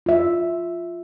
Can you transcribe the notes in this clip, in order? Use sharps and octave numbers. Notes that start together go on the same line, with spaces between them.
F4 E5